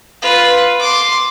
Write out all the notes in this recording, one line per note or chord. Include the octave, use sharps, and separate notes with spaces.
F4 B4
C6 D6